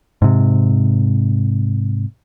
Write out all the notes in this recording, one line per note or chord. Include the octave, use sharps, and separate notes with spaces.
G#2 C3